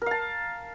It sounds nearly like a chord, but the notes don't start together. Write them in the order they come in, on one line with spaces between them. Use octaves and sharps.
A#4 F5 A5